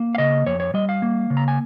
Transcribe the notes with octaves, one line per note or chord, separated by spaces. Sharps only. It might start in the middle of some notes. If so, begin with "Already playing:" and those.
Already playing: A#3
F5
C#3 D#5
F2 C#5
C#5
G3 D#5
F5
A#3
C#3
A#5
G#5